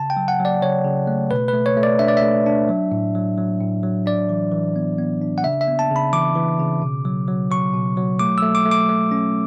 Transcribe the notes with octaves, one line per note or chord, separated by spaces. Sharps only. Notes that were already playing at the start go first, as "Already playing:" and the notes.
Already playing: C#3 A5
G5
F#3
F#5
F#3
D5
C#3 C#5
C#3
A3
B2 B4
A3 B4
C#5
A3
D5
D4 E5
D5
E5
A3
D4
F#3
A2
F#3
F#3
A2
F#3
D4 D5
E3
E3
B3
B3
D4
F#5
C#3 E5
E5
B3
A5
C#3
B5
E3 D6
E3
C#3
B2
F#3
F#3
F#3 C#6
B2
F#3
A3 D6
A3 E6
D6
A3
D6
A3
C#4